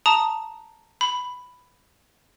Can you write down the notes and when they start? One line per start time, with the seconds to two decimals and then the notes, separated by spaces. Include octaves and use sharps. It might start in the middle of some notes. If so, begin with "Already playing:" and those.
0.06 A5 A#5 D#6 F7
1.01 B5